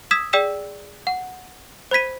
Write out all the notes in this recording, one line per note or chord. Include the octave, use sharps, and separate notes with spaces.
D#6 E6 G#6 B6 E7
G#4 D5 G5 E6 B6 E7
F#5
C5 B5 G#6 B6 D#7